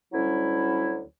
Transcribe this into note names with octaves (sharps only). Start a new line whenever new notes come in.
D2 F#3 G3 C#4 E4